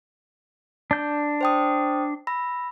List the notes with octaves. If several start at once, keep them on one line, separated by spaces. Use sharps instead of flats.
D4 G6
C5 G5 D#6
B5 E6 A#6